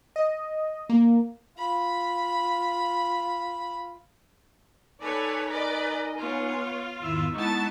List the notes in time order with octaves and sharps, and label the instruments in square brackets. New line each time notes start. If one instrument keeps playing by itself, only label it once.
[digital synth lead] D#5
A#3
[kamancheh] F4 [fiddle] B5
[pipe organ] D#4 G#5 [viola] A4 D5 [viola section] B4 C#5
[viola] A#4 D#5 [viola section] B4 D5
[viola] B3 C#5 [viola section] F4
[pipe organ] E2 G#2 D#3 [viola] E4 E5
[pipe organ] G#3 C#6 [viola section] B3 A5 [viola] D#4 E4